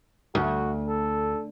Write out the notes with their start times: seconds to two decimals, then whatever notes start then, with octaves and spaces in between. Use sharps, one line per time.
0.35 D2 F#4
0.88 A4